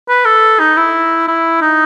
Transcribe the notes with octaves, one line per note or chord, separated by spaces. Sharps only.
B4
A4
D#4
E4
E4
D#4